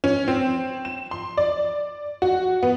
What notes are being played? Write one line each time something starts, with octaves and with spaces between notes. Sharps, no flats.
C#4
C4
E7
C6
D5
F#4
B3